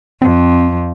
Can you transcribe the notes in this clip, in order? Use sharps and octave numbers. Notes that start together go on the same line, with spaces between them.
F2 C4